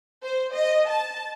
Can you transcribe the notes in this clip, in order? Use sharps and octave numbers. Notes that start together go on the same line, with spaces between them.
C5
D#5
A5